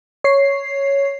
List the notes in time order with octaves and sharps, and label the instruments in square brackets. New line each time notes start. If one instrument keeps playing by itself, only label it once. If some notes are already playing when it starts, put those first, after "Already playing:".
[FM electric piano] C#5 C7